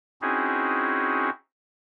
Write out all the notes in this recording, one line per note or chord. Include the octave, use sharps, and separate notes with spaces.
C4 C#4 D#4 E4 F#4 G#4